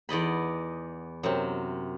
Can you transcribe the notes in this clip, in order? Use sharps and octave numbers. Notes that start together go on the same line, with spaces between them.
E2 D5 D#5 B5
F#2 C3